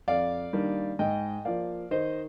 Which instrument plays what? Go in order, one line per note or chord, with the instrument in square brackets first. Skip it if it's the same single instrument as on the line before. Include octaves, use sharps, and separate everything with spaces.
[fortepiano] F2 D5 F5
D#3 G3 A#3 D4
G#2 D#5 G5
F3 A#3 D5 F5
D#3 C5 D#5